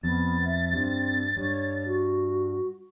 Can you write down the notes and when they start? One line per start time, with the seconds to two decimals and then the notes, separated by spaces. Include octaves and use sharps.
0.03 F2 B3 A6
0.45 E5
0.73 G2 C4
1.37 G2 C#5
1.85 F#4